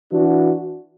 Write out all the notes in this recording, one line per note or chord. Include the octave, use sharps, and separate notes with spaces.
E3 D4 F#4